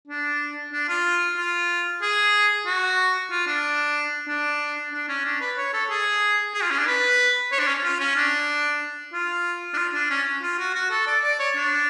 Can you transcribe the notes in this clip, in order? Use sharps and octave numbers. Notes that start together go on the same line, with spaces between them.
D4
D4
F4
F4
G#4
F#4
F4
D4
D4
D4
C#4
D4
B4
C#5
A4
G#4
G#4
F4
C#4
D4
B4
C#5
D4
C#4
F4
C#4
D4
F4
D4
F4
D4
C#4
F4
F#4
F#4
A4
D5
D5
C#5
D4